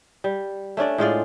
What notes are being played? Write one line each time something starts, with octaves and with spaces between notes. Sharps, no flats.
G3
A3 C#4 D4 D5
A2 G#3 F4 D5